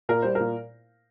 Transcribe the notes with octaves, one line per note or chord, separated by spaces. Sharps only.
A#2 A#4
G3 C5
A#4
A#2